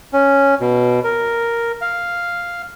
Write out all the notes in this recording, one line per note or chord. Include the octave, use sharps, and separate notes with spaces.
C#4
B2
A#4
F5